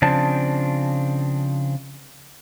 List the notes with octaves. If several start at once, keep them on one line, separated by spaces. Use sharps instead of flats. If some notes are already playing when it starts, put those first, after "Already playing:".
C#3 F3 C4 D4 A5